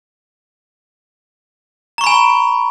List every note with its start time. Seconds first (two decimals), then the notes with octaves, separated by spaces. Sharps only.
1.98 A#5
2.01 C#6
2.04 B5
2.07 G#5